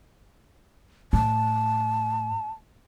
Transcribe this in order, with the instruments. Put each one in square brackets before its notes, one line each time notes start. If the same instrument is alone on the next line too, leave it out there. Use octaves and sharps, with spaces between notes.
[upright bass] A2 [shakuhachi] A5